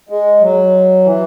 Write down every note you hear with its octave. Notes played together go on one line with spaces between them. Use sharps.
G#3
F#3
E3